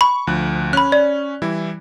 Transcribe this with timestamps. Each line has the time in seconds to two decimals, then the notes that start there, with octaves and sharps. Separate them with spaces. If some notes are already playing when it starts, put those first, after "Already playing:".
0.01 B5 C#6
0.27 D2 F3 F#6
0.73 C#4 B5 F#6
0.92 D5
1.42 E3 G3 E4